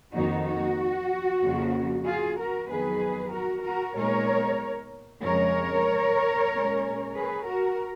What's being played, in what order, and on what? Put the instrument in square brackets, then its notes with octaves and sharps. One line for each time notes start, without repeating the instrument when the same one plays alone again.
[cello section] F2 D#3 A#3 D#4 F#4
F#4
F2 C#3 F3 A#3
F4 G#4
F#4 A#4
F2 D#3 F#3 B3 G#4 B4
F#4 A#4
F#4 A#4
A#2 G#3 B3 D#4 A#4 C#5
F2 C#3 G#3 A#4 C#5
A#2 G#3 C#4
G#4 B4
F#4 A#4